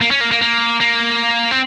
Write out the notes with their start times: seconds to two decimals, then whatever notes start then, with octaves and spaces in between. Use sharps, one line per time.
0.02 A#3
0.11 C#4
0.21 A#3
0.31 A#3
0.41 A#3
0.80 A#3
1.51 C4